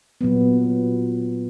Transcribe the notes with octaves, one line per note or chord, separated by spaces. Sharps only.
A#2 F#3 B3